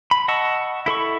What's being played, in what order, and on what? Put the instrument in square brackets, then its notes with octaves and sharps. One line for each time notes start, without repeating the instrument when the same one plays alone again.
[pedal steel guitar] B5
D#5 F#5 A5 C#6 E6
E4 A4 B5 C#6